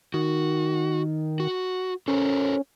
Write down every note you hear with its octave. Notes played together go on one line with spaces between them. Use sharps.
D#3 F#4
F#4
C#4 A4 A#4 C5